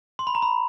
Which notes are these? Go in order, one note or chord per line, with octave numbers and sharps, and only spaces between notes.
C6
B5
A#5
B5